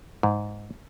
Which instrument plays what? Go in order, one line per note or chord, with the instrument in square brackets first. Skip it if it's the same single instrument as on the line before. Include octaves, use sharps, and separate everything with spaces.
[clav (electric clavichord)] G#2